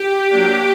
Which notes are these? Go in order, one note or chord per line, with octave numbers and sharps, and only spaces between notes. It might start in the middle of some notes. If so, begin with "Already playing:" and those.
Already playing: G4
F#3 A#3 D4